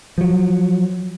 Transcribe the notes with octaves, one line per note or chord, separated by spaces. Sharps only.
F3 F#3